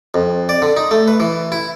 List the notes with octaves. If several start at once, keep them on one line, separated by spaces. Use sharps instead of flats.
F2
D5
D3
D#4
A3
B4
E3
E4